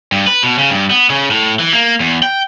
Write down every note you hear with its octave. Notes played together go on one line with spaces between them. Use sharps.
G2
B4
B2
C#3
G2
B3
C#3
A2
E3
A#3
E2
G5